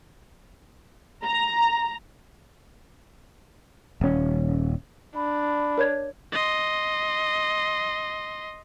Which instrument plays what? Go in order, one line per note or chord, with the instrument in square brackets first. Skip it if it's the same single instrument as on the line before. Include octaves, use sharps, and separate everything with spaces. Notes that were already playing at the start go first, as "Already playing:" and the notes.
[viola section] A#5
[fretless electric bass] D#1 C#4
[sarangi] D4 [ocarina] B5
[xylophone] A#4 C#5 G#6
[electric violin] D#5 C6